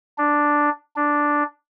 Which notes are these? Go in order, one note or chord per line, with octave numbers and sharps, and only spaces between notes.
D4
D4